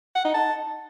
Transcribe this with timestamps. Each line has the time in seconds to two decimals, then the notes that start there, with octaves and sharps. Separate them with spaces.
0.15 F#5
0.25 D#4
0.34 A5